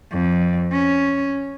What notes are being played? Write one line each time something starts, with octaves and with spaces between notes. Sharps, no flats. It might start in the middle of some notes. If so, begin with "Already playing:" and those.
F2
C#4